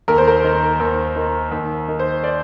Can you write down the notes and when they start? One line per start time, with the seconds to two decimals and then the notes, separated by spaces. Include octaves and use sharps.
0.08 D#2 A#4
0.18 C5
0.28 A#4
0.44 D#3
0.80 D#2
1.16 D#3
1.52 D#2
1.88 D#3
2.00 C5
2.24 D5